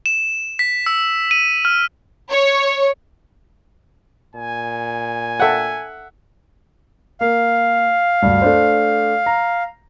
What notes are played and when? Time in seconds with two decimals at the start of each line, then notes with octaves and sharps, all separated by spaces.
0.06 E7
0.59 B6
0.86 E6
1.31 D#7
1.65 F6
2.31 C#5
4.35 A#2 G#5
5.40 A4 E5 F#5 G5
7.21 A#3 F5
8.22 D2 G2
8.42 A3 D4 C5
9.26 A#5